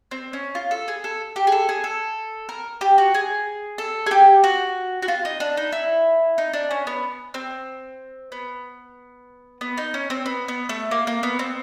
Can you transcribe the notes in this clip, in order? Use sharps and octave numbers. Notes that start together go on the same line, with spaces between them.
C4
C#4
F4
A4
G#4
A4
G4
G#4
A4
G#4
A4
A#4
G4
F#4
G#4
A4
G#4
G4
F#4
F#4
F4
D#4
D4
D#4
E4
D#4
D4
C#4
B3
C4
B3
B3
D#4
C#4
C4
B3
B3
A3
A#3
A#3
B3
C4